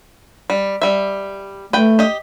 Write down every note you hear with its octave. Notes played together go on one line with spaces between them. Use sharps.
G3
G3 E5
A3 B4 G5
G4 D#5